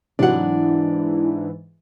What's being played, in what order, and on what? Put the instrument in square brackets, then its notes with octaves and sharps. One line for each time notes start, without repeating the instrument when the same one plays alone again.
[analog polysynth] G#2 E3 [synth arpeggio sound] C3 F#3 [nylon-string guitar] D4 F#5 [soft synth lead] E4